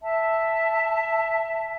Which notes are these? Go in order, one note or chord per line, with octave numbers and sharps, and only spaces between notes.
E5 A5